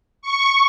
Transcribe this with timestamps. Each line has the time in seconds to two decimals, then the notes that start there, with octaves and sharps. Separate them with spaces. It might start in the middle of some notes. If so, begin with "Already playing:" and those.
0.22 C#6